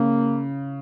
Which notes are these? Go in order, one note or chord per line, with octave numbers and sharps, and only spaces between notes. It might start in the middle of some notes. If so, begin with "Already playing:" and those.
Already playing: C#3 A#3